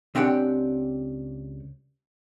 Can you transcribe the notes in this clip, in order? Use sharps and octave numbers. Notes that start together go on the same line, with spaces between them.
C#2 C4 D4 G4 F#5 G5